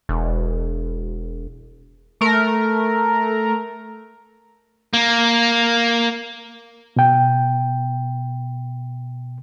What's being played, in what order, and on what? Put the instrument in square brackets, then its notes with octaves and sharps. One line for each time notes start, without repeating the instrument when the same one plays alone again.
[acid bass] E1
[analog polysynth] A3 A#4
[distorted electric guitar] A#3
[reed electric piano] B2 G5